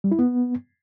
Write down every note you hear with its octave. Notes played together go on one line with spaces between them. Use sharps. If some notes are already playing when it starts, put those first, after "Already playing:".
G3
E4
B3